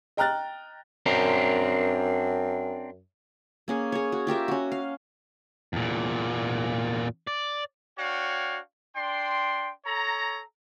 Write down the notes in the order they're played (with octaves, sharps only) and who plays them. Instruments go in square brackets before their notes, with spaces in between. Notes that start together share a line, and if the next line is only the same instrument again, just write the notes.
[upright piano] D#5 G5 A#5 F6 F#6 A6
[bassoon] F#2 [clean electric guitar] C4 D4 A#4
[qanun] A#3 C#4 G#4
G#4 C#5
F#4
F4 G4 A#4 E5
C#4 F#4
F5
[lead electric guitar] E2 A#2
D5
[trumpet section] D4 F#4 C#5 F5 G5
D4 G5 C6
A4 C#5 A#5